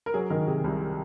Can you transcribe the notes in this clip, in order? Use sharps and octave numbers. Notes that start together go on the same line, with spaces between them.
A#4
F#3 G#4
D#3 A#4
C3 G#4
C2